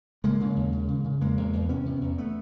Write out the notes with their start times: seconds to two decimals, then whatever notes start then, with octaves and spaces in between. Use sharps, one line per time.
0.24 C#3 G#3 A#3
0.40 C#3
0.56 D#2
0.73 C#3
0.89 C#3
1.05 C#3
1.21 E2 G#3 A#3
1.37 E2
1.53 E2
1.69 C3 B3 C#4
1.85 C3
2.01 E2
2.18 A3 B3